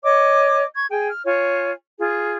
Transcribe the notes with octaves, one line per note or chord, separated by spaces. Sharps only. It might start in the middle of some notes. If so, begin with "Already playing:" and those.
C#5 D#5 D6
C#6 G#6
G#4 G5 G#5
F6
F4 C#5 G#5
F4 G#4